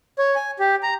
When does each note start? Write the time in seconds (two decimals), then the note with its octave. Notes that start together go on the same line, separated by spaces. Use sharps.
0.19 C#5
0.36 G#5
0.59 G4
0.83 A#5